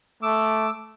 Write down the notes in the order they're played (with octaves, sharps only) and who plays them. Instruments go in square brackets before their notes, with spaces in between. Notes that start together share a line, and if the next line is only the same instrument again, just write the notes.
[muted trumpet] A3 [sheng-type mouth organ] D6 E6